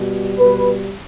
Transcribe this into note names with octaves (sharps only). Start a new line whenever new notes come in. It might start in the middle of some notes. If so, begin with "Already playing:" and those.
Already playing: B2 G3
B2 G3 B4